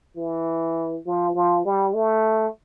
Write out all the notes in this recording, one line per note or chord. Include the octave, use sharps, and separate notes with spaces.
E3
F3
F3
G3
A3